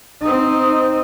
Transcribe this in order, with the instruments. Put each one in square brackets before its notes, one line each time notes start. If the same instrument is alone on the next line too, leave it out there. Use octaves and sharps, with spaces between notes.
[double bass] C4 D#4